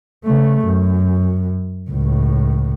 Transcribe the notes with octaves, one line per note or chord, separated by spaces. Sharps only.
C#3 A3
F#2
C#2 A2